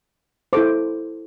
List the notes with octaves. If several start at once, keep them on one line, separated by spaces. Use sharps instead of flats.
E4 A4 C5 D6